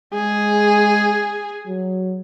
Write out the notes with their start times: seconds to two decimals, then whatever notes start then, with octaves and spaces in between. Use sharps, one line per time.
0.14 G#3 G#4
1.67 F#3